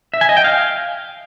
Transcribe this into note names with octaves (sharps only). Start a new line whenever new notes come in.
E5
G#5
D#5
G5
F5